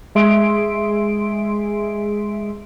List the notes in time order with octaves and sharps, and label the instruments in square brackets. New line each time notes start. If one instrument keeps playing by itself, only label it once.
[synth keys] G#3 G#4 E5 C6 D7